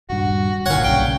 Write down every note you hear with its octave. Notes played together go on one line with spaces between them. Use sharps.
D#1 G2 F#4
G1 D2 A#2 D#3 C#5 F#5
B1 G2 C#3 G5